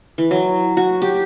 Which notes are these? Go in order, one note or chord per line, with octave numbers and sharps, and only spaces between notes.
E3
F#3
F#4
G4